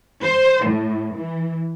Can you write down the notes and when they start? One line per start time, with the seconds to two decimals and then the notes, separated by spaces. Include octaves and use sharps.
0.23 C5
0.65 A2
1.16 E3